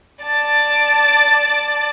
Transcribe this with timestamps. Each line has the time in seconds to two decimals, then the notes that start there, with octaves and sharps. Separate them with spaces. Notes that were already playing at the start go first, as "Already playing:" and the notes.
0.23 D5 A5